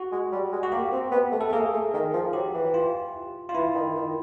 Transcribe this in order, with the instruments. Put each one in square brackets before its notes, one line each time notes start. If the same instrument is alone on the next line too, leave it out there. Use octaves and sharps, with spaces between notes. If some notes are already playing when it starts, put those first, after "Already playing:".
Already playing: [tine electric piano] F#4
[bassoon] G#3
G3
G#3
[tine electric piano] F#4
[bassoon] A#3 [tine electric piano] G4
[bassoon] C4
B3
A3
[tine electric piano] A4
[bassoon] A3
[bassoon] A#3 [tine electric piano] G#4
[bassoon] A3
D#3
F3
[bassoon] F#3 [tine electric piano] G4
[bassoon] E3
[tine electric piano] F4
F4
[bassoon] E3 [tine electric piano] E4
[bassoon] D#3
D#3